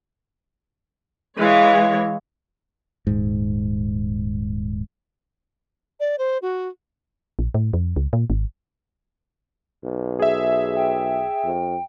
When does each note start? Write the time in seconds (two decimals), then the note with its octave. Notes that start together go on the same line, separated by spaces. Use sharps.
1.37 E3 G#3 C#5 F5 D#7
3.07 D#1 G#2
6.00 D5
6.18 C5
6.42 F#4
7.39 A#1
7.54 A2
7.73 F2
7.96 C#2
8.13 A#2
8.30 G#1
9.84 B1
10.19 G#4 E5
10.76 G5
11.45 F2